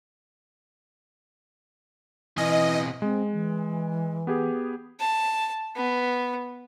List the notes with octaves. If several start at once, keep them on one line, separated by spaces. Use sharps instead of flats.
B2 E3 C4 D#5 G#5
G#3 C4
E3
B3 G4 G#4
A5
B3